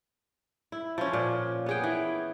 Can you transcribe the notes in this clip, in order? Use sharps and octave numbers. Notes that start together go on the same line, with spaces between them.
E4
F3 C#4
A#2
B3 G#4 G5
E3